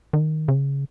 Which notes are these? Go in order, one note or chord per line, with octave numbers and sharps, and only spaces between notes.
D#3
C#3